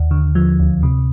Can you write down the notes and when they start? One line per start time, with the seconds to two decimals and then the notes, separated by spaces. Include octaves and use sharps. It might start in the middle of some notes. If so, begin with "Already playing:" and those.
Already playing: D#2
0.11 D3
0.35 F3
0.59 D2
0.83 C3